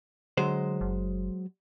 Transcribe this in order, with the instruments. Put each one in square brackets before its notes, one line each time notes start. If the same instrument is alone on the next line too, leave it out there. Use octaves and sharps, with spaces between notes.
[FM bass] D3 [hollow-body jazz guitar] F#3 G#3 C5
[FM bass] F#1